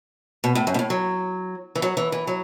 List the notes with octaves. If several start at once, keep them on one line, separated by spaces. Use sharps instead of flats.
B2
A2
F#2
B2
A2
F#3
E3
F#3
E3
E3
F#3